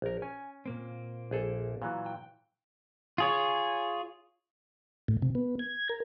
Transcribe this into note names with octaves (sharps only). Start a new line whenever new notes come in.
A#1 A#4
C#4 G#5
A#2 A#3 C4
A#1 G#4 A4
A#2 E3 F#3
G5
F4 G#4 C#5
A2
C3
B3
G#6
A#4